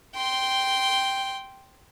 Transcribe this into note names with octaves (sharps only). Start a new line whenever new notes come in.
G5 C6